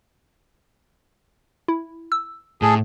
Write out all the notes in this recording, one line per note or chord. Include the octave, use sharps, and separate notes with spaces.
E4
E6
A2 G#4 A4